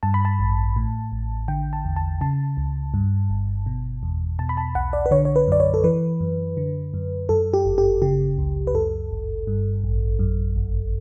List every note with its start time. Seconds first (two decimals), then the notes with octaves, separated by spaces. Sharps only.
0.03 G2 A5
0.14 B5
0.25 A5
0.39 A1
0.76 A2
1.12 A1
1.48 D3 G5
1.73 A5
1.85 E2
1.96 A5
2.21 C#3 A5
2.57 C#2
2.94 G2
3.30 G1
3.66 B2
4.03 E2
4.39 B2 A5
4.49 B5
4.57 A5
4.75 B1 F#5
4.93 D5
5.06 B4
5.11 D3 C#5
5.25 C#5
5.36 B4
5.48 F#2 D5
5.60 C#5
5.74 A4
5.84 E3 B4
6.20 F#2
6.57 D3
6.94 F#2
7.29 F#2 A4
7.54 G4
7.65 G1
7.78 G4
8.02 C#3 G4
8.38 C#2
8.67 B4
8.74 F#2 A4
9.11 G1
9.47 G2
9.84 A1
10.19 F#2
10.56 G1